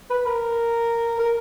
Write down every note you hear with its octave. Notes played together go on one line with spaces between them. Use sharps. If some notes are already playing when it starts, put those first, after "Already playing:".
B4
A#4
A#4